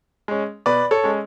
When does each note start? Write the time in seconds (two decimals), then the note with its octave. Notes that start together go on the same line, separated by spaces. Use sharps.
0.28 G#3 C#4
0.66 B2 B4 D5
0.91 A4 C#5
1.04 G#3 C#4